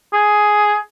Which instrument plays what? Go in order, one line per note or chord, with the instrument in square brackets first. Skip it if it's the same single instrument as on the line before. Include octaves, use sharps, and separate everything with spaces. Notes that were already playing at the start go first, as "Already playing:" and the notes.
[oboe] G#4